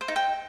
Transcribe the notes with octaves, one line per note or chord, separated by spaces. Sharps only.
C5
D#4
G5